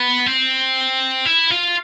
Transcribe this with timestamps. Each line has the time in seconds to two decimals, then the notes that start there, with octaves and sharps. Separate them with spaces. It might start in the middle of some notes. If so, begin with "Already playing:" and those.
Already playing: B3
0.26 C4
1.25 E4
1.51 F4